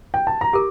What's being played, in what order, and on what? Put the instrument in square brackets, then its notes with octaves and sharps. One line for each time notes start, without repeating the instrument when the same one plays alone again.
[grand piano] G5
A5
A#5
[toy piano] G4 A#4 [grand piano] D6